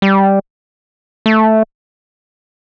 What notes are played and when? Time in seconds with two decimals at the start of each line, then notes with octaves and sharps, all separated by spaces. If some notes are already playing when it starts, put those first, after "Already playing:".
0.02 G3
1.26 A3